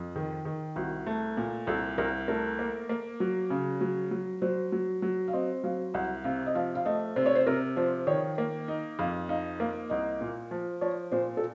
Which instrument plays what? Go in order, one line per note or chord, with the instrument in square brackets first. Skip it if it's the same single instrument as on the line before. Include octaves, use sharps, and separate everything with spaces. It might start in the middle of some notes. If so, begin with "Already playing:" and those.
Already playing: [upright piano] F2
D#3
D#3
[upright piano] C2 [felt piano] F#4
[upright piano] A3
A#2
[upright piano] C2 [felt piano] A4
[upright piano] C2 [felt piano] A#4
[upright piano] A3 [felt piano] A#4
[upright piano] A#3
A#3
F#3
C#3
F#3
F#3
[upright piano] F#3 [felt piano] C5
[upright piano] F#3
F#3
[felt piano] F5
[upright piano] C4 [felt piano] D#5
[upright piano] F#3 [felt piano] F5
[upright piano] C2 [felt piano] F#5
[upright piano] C3 [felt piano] F5
[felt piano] D#5
[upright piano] F3 [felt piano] F5
[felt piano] F5
[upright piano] A3 [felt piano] D#5
[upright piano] C3 [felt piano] C5
[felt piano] C#5
C5
[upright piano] C3 [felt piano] A#4
[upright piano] F3 [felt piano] C5
[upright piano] D#3 [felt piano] C#5
[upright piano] A#3
D#4
[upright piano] F2 [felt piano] F5
[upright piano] D#4 [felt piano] F5
[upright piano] A#3 [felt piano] F5
[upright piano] C2 [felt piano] D#5
[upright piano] A#2
F3
[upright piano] F3 [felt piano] C#5
[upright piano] A#2 [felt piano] C5
[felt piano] A4